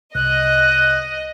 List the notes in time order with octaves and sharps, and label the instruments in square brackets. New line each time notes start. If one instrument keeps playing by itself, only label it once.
[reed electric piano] C2 [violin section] D#5 [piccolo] F#6